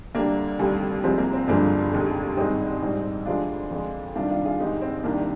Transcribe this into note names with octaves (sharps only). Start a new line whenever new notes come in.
D2 C3 G3 A#3 D4
F1 D#2 D3 G3
C2 C3 F3 G#3 C4
A#3
C4
G1 G2 F3 G#3 A#3 D4
F1 D#2 D3 G#3
G#1 G2 D#3 G#3 C4 D#4
A#1 G#2 G3
D2 C3 F3 G#3 D4 F4
F2 D3 G#3
C2 C3 D#3 G3 D4 F4
D4 F4
F4 G#4
G#1 G#2 D#3 G#3 D#4 G4
C4
C2 C3 D#3 A#3 D4